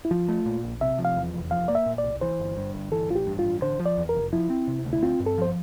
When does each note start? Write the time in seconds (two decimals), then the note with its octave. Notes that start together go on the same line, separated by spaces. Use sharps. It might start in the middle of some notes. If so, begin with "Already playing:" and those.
0.05 E4
0.11 F3 F4
0.28 A3
0.46 A#2
0.64 A#1
0.81 C3 E5
0.98 F3
1.05 F5
1.16 E2
1.34 F1
1.51 F3 F5
1.68 A#3 D5
1.75 E5
1.86 A#2
1.98 D5
2.04 C2
2.21 E3 C5
2.40 G1
2.57 G2
2.75 G1
2.92 E3 A4
3.10 A1 F4
3.15 G4
3.27 G2
3.39 F4
3.45 A1
3.62 D3 C5
3.80 F3
3.86 D5
3.97 E2
4.09 A#4
4.15 F1
4.33 F3 E4
4.50 C4
4.68 C3
4.85 D2
4.93 E4
5.02 C4 F4
5.20 G2
5.26 A4
5.38 F3 C5